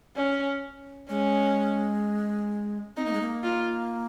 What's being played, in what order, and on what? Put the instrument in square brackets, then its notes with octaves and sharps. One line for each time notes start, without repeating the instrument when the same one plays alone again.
[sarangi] C#4
[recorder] G#3 [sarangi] C#4
[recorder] C4 [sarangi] D#4
[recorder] A#3
G#3
A#3
[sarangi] F4